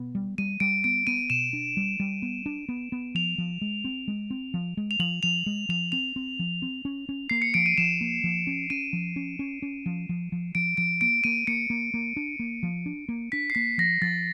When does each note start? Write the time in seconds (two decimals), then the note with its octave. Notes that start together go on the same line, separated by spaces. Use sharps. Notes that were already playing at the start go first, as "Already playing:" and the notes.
Already playing: B2 B3
0.15 G3
0.38 G3 D#7
0.60 G3 D7
0.84 B3 D7
1.07 B3 D#7
1.30 B2 E7
1.53 D4
1.77 G3
2.00 G3
2.22 B3
2.46 D4
2.69 B3
2.92 B3
3.15 F3 F7
3.38 F3
3.61 G#3
3.84 C4
4.08 G#3
4.30 C4
4.54 F3
4.77 G#3
4.91 F7
4.99 F3 F#7
5.23 F3 F7
5.46 G#3
5.69 F3 F7
5.92 C4 F7
6.16 C4
6.39 F3
6.62 C4
6.85 C#4
7.09 C#4
7.30 A#3 C7
7.42 C#7
7.54 F3 D7
7.66 D#7
7.78 F3 E7
8.01 A#3
8.24 F3
8.47 C#4
8.70 C#4 D#7
8.93 F3
9.16 C#4
9.39 C#4
9.62 C#4
9.86 F3
10.09 F3
10.32 F3
10.55 F3 D7
10.77 F3 D7
11.01 A#3 D7
11.24 A#3 D#7
11.47 A#3 C#7
11.70 A#3
11.94 A#3
12.16 D4
12.39 A#3
12.63 F3
12.86 D4
13.09 A#3
13.32 D4 B6
13.50 C7
13.55 A#3 B6
13.78 F3 A#6
14.02 F3 A6